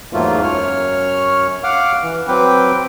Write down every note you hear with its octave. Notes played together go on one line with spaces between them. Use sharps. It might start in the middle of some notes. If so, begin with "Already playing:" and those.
E2 G#2 F#3 A3 A#3 F4
F#2 C#5 F6
F5 F#5 D6 F6
E3
F#3 C4 B4 G5 D6